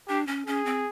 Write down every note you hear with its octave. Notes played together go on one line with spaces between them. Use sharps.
D4 G4
C#4
C#4 G#4
C4